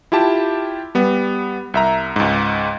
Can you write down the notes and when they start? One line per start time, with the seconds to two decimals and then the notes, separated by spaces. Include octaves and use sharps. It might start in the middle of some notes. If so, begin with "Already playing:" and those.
0.12 E4 F4 G4 A5
0.95 G3 B3
1.74 C2 E5 A#5
2.16 C#2 G#2